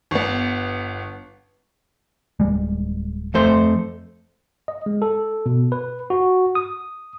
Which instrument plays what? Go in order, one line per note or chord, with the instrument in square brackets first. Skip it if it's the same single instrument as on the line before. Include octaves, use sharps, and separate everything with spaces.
[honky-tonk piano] G1 B3
[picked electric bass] D1 G3 G#3
[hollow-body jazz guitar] F2 A3 C5
[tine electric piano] D#5
G#3
A4
B2
B4
F#4
D#6